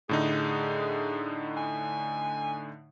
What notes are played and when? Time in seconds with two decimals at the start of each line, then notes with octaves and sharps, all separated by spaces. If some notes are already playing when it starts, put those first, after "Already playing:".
0.09 A2 D3 D#4 G#4
1.57 G#5